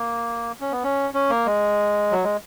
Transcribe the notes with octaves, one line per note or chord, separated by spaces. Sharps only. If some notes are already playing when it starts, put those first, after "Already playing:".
Already playing: A#3
C#4
B3
C#4
C#4
A#3
G#3
F#3
G#3